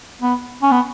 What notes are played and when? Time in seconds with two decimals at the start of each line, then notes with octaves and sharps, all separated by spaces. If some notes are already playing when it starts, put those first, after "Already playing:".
0.22 B3
0.62 C#4
0.71 B3